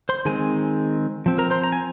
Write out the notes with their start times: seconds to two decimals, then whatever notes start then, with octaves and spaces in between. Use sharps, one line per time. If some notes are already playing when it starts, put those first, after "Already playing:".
0.09 C5 C6
0.25 D#3 G#3 C4 G#4 G#5
1.26 F3 C4
1.38 A#4 A#5
1.51 C5 C6
1.63 A#5
1.72 G#5